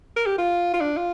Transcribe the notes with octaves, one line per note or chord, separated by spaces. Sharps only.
A#4
G4
F4
F4
D4
F4